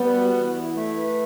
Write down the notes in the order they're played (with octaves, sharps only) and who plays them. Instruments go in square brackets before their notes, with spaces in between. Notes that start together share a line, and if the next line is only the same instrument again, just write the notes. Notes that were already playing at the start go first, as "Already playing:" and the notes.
Already playing: [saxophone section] G3 [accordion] B3
[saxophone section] F#4
E3
E4
A3
B4